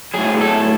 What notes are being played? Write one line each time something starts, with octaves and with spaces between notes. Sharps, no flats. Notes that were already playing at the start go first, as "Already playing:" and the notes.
A2 F#3 G#4
A4